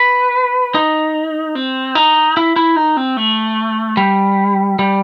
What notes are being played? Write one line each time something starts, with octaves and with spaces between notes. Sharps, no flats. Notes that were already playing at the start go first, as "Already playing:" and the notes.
Already playing: B4
D#4
C4
D#4
E4
E4
D#4
C4
A3
G3
G3